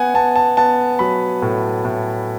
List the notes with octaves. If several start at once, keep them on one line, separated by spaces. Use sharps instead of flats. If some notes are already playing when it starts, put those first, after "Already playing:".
Already playing: B3 F#5 G#5
B3 A5
A5
B3 A5
F#3 B5
A2
A2